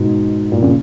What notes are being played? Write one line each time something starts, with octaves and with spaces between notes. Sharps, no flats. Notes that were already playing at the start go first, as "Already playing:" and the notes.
Already playing: G#2 B2
A#2
A#2 C#3